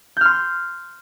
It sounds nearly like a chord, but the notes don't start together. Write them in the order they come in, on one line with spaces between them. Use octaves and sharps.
G6 F6 C6